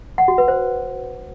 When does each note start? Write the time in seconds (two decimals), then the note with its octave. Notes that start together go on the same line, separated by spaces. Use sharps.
0.18 F#5
0.28 F#4
0.38 B4
0.48 C5